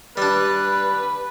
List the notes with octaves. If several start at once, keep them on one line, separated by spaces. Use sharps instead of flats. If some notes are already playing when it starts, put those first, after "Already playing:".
G3 D4 B4